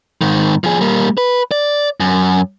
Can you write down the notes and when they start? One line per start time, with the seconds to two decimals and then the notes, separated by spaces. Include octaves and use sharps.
0.21 G#2 D#3
0.64 F3 G#4
0.81 G3 A#3
1.18 B4
1.51 D5
2.00 F#2